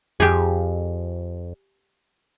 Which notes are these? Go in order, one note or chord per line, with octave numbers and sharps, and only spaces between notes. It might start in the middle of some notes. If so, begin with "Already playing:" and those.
F2 G4 G#4